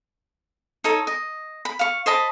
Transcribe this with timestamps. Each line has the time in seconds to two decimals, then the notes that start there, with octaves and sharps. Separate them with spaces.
0.84 D#4 A4 C#5
1.07 D#5
1.65 B5
1.79 F5 C#6
2.06 C5 D#5 A5 B5